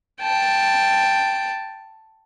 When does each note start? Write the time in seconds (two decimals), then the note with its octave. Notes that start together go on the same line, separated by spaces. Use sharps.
0.21 G5 A5